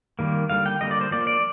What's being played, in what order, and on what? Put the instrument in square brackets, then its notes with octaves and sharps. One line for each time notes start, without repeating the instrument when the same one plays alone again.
[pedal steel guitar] D#3 G3 A#3
D3 G3 A#3 F5
G5
D3 G3 A#3 D#5
D5
C5
F3 A#3 D5
D5